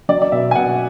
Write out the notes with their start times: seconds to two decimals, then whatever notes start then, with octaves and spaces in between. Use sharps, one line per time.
0.09 F#3 D5
0.22 D5
0.32 B2 E5
0.51 G#5
0.55 B2 F#5